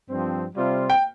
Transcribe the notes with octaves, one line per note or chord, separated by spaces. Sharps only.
G2 F3 C4
C3 G3 C4 F4
G5